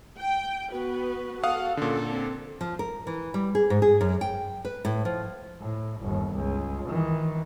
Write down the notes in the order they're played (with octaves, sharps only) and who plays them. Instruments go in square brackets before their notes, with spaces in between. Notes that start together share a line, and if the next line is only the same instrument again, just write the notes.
[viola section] G5
[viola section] B3 B4 [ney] F#4
[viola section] A4 [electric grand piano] F5 F#5 D#6
[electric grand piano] A#2 D3 [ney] C#4
[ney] C4
[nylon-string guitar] F3
A#4
E3
G3
G#4
G#2
G#4
F#2
G5
B4
A2
F3
[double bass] A2
G1 D#2
C#2
D#3 E3